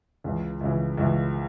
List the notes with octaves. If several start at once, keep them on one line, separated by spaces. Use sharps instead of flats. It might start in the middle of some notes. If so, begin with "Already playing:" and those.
C#2 C#3 E3
C#2 C#3 E3
C#2 C#3 E3